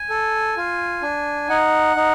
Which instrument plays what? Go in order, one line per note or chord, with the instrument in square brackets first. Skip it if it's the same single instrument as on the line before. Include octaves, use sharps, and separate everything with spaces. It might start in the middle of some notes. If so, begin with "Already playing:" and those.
Already playing: [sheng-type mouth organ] G#5
A4
F4
D4
D#4 F#5
D#4